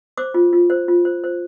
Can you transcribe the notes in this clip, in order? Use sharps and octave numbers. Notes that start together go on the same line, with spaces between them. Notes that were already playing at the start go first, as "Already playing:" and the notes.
C5 D6
F4
F4
C5
F4
C5
C5